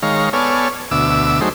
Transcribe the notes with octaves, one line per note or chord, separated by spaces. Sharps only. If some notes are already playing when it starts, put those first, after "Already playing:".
D#3 G#3 C#5 F5 A#5
B3 A4 C#5 D5 G#5 F6
D2 B2 E5 D6 E6
F#3 A3 D#4 G#4 C5